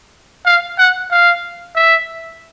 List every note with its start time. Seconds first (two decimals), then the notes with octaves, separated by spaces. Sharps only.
0.46 F5
0.79 F#5
1.11 F5
1.75 E5